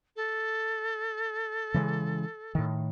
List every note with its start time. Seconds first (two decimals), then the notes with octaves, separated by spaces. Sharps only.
0.16 A4
1.74 C#3 E3 G#3
2.55 A2 D#3